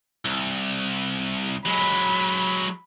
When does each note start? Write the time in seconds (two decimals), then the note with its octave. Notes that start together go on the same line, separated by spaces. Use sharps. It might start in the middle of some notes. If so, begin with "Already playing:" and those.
0.25 C2
1.66 F#3 G#3 B5